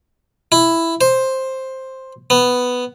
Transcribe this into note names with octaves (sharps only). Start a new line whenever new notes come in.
E4
C5
B3